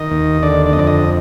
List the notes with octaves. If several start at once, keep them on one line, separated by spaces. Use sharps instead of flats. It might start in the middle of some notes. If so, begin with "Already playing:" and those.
Already playing: D#3 D#5
D#2
D3 D5
D5
D#5
F2 D5
D#5